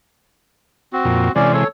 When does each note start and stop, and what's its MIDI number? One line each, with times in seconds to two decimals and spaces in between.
0.93 1.32 60
0.93 1.32 66
1.05 1.29 41
1.05 1.29 46
1.36 1.64 48
1.36 1.64 52
1.36 1.64 56
1.36 1.52 61
1.36 1.52 74
1.53 1.68 69
1.53 1.68 73